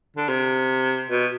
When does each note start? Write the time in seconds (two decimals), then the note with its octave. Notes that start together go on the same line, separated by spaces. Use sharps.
0.17 D3
0.29 C3
1.09 B2